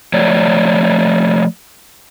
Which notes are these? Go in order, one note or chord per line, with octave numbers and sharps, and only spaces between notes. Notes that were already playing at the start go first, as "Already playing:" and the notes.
F3 A3 C#5 D5